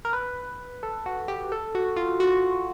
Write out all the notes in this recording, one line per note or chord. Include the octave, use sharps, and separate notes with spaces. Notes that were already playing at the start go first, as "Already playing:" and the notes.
A#4
B4
A4
F#4
G4
A4
F#4
F4
F#4